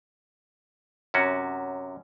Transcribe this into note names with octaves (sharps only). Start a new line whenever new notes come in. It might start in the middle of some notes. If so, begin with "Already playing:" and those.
F#2 C3 C#4 F#4